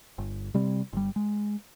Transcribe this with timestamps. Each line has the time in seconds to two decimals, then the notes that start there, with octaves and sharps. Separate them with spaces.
0.18 G1
0.54 C3 G3 C4
0.93 G1 G3
1.16 G#3